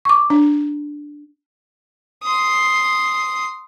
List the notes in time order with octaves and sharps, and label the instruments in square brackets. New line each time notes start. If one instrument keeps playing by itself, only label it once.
[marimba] C#6 D6
[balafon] D4
[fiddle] C6 D#6